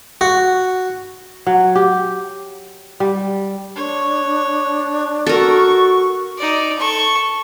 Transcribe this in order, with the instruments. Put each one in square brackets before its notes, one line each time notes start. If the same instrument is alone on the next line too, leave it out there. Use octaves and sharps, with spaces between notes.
[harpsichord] F#4
[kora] F#3
G4
G3
[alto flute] D4 [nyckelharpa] C#5
[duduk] F#4 [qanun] A4 A#4 [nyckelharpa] C#6
[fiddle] D#4 D5
A4 C#6